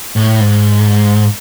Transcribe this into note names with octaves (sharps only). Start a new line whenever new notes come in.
A2
G#2